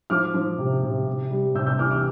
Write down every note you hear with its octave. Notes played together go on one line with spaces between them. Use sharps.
F3 D6 F6
F3
C3
C3
C3
G3
C3 E6 G6
E6 G6
E3 D6 F6
D6 F6